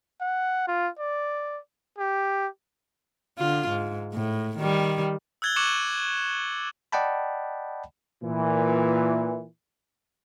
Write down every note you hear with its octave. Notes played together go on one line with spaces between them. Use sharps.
F#5
F4
D5
G4
D3 F4
G#2
A2
D#3 G3
E6 F#6 G#6 A6 G7
C#6 D6 F#6 C#7 E7 F#7
D5 D#5 F#5 G5 A5 B5
A#2 E3